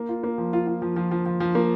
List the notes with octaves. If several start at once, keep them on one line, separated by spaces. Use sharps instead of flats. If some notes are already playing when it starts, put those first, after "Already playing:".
Already playing: A#3
F4
A#3
F3
F4
F4
F3
F3
F3
F3
F3
A#3